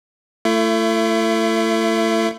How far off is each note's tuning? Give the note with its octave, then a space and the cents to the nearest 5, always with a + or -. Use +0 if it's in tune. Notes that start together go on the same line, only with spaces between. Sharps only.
A3 +20 E4 +40